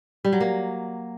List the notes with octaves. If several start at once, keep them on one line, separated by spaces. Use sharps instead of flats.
G3
F#3
A#3